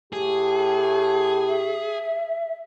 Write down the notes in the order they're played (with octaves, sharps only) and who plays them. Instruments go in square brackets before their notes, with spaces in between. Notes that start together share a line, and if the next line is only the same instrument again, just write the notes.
[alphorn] A2 [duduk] G4 [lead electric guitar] G#4
[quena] E5